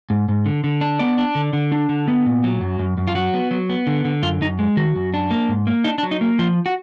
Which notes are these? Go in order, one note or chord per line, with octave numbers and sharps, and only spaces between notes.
G#2
G#2
D3
D3
D4
B3 D5
D4
D3
D3
D4
D3
B3
A#2
F#3
F#2
F#2
F#2
F4
F#3 F#4
B3
F#3
B3
D3
D3
F#2 F4
F#2 D#4
G#3
D#3 F#4
F#2
D4
A#3
G#2
A#3
D4 D#4
D4
F#3
D#4
A#3
F3 F4
F#4